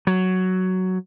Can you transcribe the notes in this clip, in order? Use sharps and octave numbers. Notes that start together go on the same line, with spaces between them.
F#3